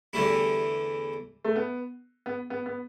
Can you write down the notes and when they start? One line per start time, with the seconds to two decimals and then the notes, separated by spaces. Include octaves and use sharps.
0.13 E2 D3 G3 A3 E4
1.45 A3
1.56 B3
2.26 B3
2.50 B3
2.66 B3